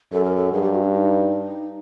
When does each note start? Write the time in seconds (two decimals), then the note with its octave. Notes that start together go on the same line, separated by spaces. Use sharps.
0.12 F#2 A4
0.24 A#4
0.36 A4
0.52 G2 G#4
0.62 G4
0.73 F#4
0.83 D4
0.93 D#4